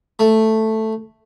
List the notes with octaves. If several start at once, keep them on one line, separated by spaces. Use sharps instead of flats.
A3